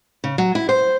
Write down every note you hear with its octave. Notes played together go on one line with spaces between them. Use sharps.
C#3
F#3
E4
C5